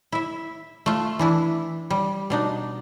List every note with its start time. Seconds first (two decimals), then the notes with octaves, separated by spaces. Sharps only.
0.12 E4 E5
0.86 A3 F4
1.19 E3 D4 E4
1.90 G3
2.30 B2 D4 D#4